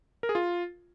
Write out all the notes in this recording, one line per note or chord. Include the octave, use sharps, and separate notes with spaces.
A#4
G#4
F4